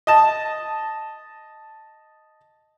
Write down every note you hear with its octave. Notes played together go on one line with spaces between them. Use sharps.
D#5 A5